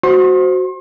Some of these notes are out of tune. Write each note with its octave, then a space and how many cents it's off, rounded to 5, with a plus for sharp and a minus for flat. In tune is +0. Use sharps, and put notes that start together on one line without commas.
F#4 +0 C5 +0 C6 +40